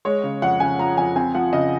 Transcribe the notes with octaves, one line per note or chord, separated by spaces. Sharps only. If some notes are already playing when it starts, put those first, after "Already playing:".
G#3 C#5
C#3
F2 F#5
C#3 G#5
F3 A#5
F2 G#5
C4 G#5
F3 F#5
C#3 D#5